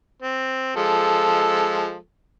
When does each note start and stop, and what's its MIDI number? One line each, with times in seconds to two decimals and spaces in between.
0.22 0.76 60
0.76 1.96 53
0.76 1.96 56
0.76 1.96 69